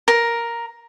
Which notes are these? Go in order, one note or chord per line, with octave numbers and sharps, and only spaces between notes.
A#4